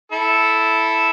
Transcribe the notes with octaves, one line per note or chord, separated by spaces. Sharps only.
E4 A4